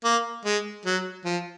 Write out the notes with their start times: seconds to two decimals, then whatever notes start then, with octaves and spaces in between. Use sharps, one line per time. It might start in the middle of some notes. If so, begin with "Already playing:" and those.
0.04 A#3
0.45 G#3
0.86 F#3
1.25 F3